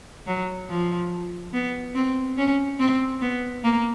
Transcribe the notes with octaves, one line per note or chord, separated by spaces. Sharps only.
F#3
F3
B3
C4
C#4
C4
B3
A#3